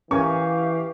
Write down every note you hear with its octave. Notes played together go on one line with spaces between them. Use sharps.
E3 C#4 G4 A#4 F5 G#5 C#6